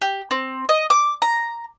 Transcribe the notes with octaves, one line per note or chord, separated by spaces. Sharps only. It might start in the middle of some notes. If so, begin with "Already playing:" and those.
G4
C4
D#5
D6
A#5